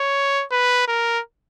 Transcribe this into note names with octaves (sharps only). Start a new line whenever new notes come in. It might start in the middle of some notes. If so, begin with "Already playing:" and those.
Already playing: C#5
B4
A#4